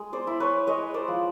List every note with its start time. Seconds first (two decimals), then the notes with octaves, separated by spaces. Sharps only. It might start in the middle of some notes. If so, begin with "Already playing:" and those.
Already playing: G#3
0.13 C5 D5
0.27 E4
0.40 B4 C#5
0.67 G#3 C#5 D#5
0.94 C5 D5
1.08 F3